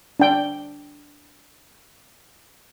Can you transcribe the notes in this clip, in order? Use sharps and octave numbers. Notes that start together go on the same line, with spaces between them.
D4 G5